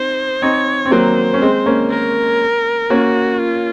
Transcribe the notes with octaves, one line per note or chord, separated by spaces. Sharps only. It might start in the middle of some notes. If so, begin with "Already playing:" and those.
Already playing: C4 D#4 C5
C4 D#4 C#5
C4
F#3 A#3 C5
C#4
G#3 C4
A#3 C#4
A#4
A#3 C#4 F#4
F4